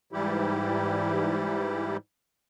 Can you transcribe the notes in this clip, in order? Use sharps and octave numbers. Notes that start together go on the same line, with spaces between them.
G#2 E3 G3 E4 G4